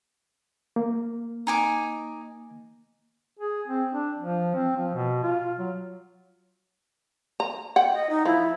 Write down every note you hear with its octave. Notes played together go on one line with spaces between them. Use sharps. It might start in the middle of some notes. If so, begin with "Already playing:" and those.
A#3
D#4 G#5 D6
G#4
C4
D4
F3
C4
F3
B2
F4
F#3
A#5
F#5 G5
D#5
D#4
F3 E4